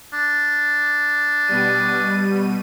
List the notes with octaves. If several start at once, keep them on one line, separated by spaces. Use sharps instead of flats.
D4
B2 G3 D#7